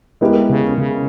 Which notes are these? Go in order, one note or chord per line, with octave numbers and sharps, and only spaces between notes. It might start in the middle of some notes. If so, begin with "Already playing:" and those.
G#3 B3 E4 G4 A#4
C#3
C#3